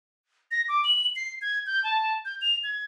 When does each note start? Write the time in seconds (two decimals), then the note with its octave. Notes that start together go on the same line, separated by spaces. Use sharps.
0.51 A#6
0.69 D6
0.84 F#7
1.16 C7
1.41 G#6
1.66 G6
1.84 A5
2.25 G6
2.41 F7
2.64 G#6